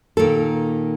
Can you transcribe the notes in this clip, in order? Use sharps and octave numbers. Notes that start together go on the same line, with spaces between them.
A#2 D#3 A4